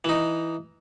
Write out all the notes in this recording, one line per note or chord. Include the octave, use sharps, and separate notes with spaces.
E3 D#4